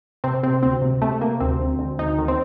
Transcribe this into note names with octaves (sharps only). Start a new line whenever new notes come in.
C3 C4
C3 C4
D2 C4
C3
C3 A3
C3 A#3
D2 C4
D2
D2
D2 D#4
D#3
C4